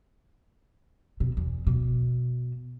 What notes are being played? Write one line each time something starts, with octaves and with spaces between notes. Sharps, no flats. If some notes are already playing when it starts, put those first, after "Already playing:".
B2
E2
B2